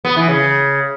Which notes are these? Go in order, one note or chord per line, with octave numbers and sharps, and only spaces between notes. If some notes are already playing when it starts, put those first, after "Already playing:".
B3
E3
C#3